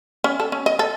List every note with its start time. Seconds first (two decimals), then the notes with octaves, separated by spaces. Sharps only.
0.24 C#4
0.40 A4
0.52 C#4
0.66 D#5
0.79 A4